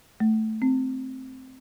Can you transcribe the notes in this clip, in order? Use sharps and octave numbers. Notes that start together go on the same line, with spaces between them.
A3
C4